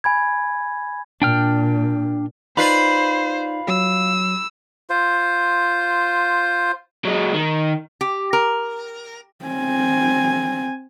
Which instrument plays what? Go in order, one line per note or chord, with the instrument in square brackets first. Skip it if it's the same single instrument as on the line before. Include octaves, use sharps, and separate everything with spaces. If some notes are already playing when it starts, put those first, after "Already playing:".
[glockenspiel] G#5 B5 G#6
[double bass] A#2 [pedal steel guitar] D4 G5 F6
[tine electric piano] D#4 D5 [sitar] F4 B4 [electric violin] C5 [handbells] B5 C7
[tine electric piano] F#3 [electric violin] E6
[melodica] F4 C5
[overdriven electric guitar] F#3 G#3
D#3
[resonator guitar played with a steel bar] G4
A#4
[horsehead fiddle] C4 G#5